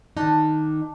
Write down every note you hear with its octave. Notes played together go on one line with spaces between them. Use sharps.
D#3 D4 D#4